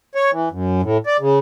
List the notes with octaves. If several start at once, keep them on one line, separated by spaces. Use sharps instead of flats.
C#5
E3
F#2
A2
D5
C#3